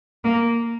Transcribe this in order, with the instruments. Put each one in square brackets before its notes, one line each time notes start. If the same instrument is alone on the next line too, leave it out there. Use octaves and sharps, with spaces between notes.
[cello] A#3